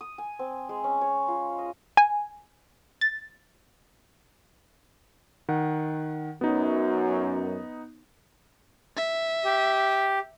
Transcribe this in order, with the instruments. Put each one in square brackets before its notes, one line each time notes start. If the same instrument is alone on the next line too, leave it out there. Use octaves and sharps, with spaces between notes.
[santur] D#6
G#5
C4
G#3
C#4
C#5
F4
D#5
[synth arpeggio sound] G#5
A6
[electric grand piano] D#3 F#5
[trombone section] F#2 [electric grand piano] B3 D#4
[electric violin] E5
[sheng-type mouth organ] G4